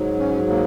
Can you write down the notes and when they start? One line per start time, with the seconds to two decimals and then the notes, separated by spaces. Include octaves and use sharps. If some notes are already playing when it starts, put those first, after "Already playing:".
Already playing: G#2 F#3
0.19 C#4
0.49 A#3